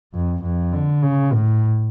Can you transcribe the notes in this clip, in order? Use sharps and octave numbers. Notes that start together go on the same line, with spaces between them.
F2
F2
D3
C#3
A2